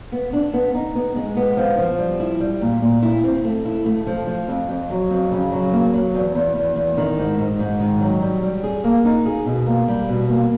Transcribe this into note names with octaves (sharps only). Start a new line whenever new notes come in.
B3
D4
B3
D#4
B3
G#3
B3
F3
F3
G3
E4
G3
A#2
A#2
E4
C4
A3
E4
A3
F3
F3
F2
F2
F#3
F2
C#3
F#3
A#3
F#3
E2
E2
E2
E2
D#3
G#2
G#2
G#2
D#3
F#3
G3
G3
G#4
A#3
D#4
G#4
B2
A#3
G3
B2
A#3